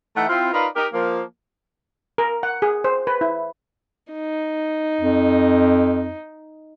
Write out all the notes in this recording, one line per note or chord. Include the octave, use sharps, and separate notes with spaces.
E3 A3 D#4 E5 F#5
C4 E4 F4
D#4 F4 A#4 B4 D5 F5
D#4 G4 A#4
F3 A#3
A#4
F#5
G#4
C5
B4
E4
D#4
F2